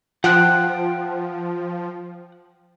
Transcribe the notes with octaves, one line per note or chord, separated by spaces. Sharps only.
F3 F#5 G5 F#6